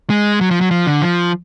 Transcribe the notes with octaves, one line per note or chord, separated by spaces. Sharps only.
G#3
F#3
F3
F#3
F3
D3
F3